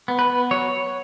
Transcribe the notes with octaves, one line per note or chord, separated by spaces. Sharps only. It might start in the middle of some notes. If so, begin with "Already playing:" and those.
B3
B4
B3
F#3 C#5